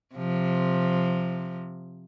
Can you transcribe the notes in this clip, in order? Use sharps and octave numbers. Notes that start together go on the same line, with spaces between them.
C3 F3